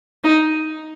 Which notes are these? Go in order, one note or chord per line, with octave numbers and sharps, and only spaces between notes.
D#4